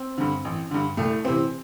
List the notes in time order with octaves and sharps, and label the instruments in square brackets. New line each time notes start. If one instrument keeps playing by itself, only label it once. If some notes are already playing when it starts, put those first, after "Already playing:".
Already playing: [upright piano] C4
G2 D3
A1
G2 D3
C2 A3
C3 E3 C4